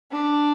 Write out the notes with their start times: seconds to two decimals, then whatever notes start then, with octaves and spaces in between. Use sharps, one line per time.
0.11 D4